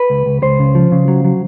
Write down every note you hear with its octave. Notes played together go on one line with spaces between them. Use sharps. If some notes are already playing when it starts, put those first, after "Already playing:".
Already playing: B4
C#2
C#2
C#2 C5
C#3
F3
C#3
F#3
F#3